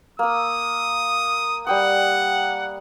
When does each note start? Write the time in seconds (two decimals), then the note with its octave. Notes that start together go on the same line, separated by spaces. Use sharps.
0.19 A#3 D#6 E6
1.67 G3 F#5 G5 D#6